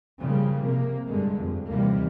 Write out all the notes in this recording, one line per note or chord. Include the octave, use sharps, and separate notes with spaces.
C#3 F3 G3 A#3
C3 A#3
G2 D3 G#3
F2
D#2 C3 E3 G3 A#3